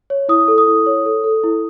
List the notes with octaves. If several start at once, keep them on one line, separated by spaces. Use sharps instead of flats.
C#5
E4 D#6
A4
D#6
E4
C#5
A4
A4
E4